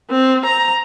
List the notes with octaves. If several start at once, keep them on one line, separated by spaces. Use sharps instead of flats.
C4
A#5